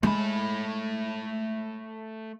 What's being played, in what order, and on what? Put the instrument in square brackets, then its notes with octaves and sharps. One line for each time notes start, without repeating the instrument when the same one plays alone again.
[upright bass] G#3 [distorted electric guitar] A3 B5